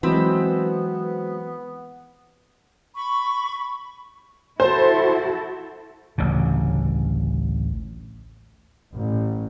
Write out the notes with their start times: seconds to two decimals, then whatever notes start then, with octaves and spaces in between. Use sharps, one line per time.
0.03 E3 F#3 G#3 B3 C4 G#4 C5 B5
2.95 B5 C#6
4.60 E4 F#4 A4 C5
6.18 A1 D2 C#3
8.95 A1